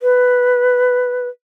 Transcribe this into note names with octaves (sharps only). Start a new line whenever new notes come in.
B4